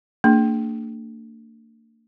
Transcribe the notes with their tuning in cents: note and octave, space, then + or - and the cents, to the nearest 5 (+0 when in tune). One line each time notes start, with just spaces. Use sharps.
A#3 -45 D4 +0 G#4 +0